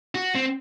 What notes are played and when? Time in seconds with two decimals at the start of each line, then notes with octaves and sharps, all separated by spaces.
0.15 F#4
0.35 C4